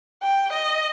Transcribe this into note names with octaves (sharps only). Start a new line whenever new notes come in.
G5
D#5